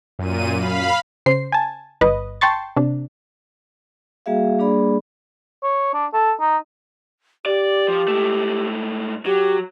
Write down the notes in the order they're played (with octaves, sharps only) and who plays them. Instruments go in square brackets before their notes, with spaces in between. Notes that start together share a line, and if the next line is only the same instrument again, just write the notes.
[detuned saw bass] F#2 [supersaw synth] A#2 D#7
[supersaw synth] F5 B5
[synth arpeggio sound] C#3 C5 C7
G#5 A5
G1 B4 D#5
G5 A5 C6 C#6 A6
C3 D4
[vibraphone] G3 A#3 F#4 G#4 E5 F5
G3 A#3 D4 G#4 D5 B5
[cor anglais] C#5
D4
A4
D#4
[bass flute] G4 [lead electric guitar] D5
[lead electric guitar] F3
G#2 A3
[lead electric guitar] F#3 [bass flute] G4